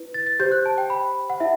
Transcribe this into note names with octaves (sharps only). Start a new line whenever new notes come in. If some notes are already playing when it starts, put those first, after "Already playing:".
Already playing: E4 B4
A6
A6
G4 C5 G6
F#6
A5
G5
B5
F#5
E4 E5